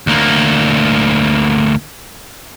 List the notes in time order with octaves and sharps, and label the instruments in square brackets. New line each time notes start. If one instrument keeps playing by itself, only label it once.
[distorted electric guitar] D2 A#3